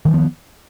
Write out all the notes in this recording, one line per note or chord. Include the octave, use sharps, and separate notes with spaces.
D#3 F3 G3 B3